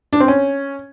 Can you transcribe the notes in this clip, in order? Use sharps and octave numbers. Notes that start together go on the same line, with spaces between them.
D4
C4
C#4